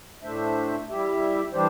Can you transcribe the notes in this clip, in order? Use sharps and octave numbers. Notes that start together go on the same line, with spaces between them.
A2 A3 D4 C5 E5
G3 E4 G4 E5
E3 G3 D4 G4 C5